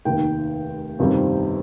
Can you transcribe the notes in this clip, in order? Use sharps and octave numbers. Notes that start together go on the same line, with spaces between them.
F1 D#2 D#3 G5
G1 F2 C3 D#3 G3